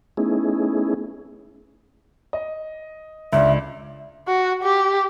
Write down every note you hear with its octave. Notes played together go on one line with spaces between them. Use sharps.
A3 B3 C#4 D#4 E4 G#4
D#5
C#2 D3 D5 E5
F#4
G4